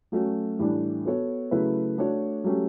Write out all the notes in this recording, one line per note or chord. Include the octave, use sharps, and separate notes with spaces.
F#3 A3 C#4 F#4
A2 E3 G3 D4
B3 F#4 A4 C#5
C#3 F#3 A3 E4 B4
A3 D4 F#4 C#5
F#3 A3 C#4 G4